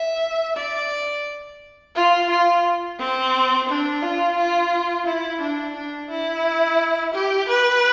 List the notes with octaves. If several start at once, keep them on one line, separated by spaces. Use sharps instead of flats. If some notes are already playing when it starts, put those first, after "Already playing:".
Already playing: E5
D5
F4
F4
C4
D4
F4
F4
E4
D4
D4
E4
G4
B4